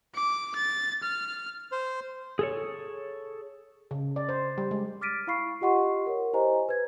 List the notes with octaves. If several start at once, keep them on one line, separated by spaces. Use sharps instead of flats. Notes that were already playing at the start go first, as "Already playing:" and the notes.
D6
A6
F6
C5
G#4 A4 C#5
C#3
D5
C5
G3
G#3
D6 F6 A6 B6 D7 D#7
E4 F5 B5 C#6 C7
F4 G4 D#5 F#5 C6 C#6
A#4 C#5
E4 G4 C5 D#5 G#5 A#5
B4 G#6